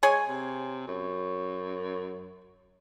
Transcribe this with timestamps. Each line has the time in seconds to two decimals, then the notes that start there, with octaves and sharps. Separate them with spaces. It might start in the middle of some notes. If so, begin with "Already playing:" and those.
0.03 G#3 G#4 C#5 G#5
0.28 C3
0.88 F#2